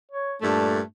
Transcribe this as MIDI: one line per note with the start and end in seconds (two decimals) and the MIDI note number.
0.12 0.35 73
0.41 0.80 43
0.41 0.80 46
0.41 0.80 57
0.41 0.79 62